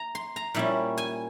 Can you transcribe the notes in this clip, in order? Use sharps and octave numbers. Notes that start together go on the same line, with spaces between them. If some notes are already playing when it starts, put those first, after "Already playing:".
Already playing: A#5
C6
A#5
A#2 G3 C#4 E4
G#5